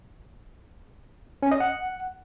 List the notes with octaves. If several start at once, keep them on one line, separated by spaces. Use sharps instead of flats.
C#4
D#5
F#5